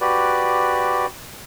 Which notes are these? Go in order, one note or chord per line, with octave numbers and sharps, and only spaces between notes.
F#4 G4 B4 D5